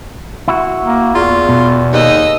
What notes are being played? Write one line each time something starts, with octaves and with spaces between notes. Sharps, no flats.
E4 F#4
A#3
E2 F4
B2
D#2 D#5 E6